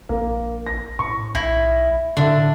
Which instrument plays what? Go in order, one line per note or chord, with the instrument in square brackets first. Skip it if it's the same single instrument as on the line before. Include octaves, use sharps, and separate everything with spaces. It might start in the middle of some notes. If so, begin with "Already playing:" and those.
[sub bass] A#1 [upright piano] A#3
[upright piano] A#6
[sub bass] A2 [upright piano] C#6
[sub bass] B1 [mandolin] E4 [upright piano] A#6
[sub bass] A2 [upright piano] D3 E5 [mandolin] D4